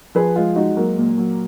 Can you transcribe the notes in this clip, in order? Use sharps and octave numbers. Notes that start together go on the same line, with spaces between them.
F3 G#4 B4
G#3 F4 G#4
G#3 D#4 F#4
F#3 A#3
A#2
F#3